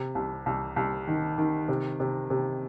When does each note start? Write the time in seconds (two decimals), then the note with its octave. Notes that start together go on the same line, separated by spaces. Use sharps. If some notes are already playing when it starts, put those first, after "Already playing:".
Already playing: C3
0.15 C2
0.46 C2
0.76 C2
1.07 D#3
1.38 D#3
1.68 C3
2.00 C3
2.30 C3